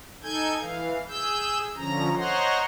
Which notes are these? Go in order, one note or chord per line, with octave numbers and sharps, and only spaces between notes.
D#4 A4 G#5 G6 G#6
E3 F5
G#4 E6 G6
D3 F3 C#4 A#5
C5 C#5 D#5 F#5 A#5 C6